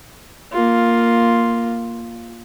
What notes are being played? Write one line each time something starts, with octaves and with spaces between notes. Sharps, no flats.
A#3 F4